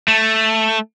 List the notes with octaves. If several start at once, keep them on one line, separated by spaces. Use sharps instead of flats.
A3